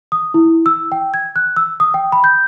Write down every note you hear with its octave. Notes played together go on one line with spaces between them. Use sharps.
D#6
E4
E6
G5
G#6
F#6
E6
D#6
G5
B5
G6